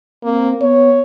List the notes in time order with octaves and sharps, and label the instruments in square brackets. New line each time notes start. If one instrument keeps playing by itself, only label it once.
[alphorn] A#3 [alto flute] C4
[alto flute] B3 [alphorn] C#5